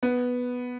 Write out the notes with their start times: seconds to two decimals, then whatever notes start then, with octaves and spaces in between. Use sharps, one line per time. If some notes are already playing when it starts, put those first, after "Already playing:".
0.03 B3